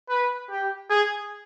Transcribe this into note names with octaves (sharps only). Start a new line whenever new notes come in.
B4
G4
G#4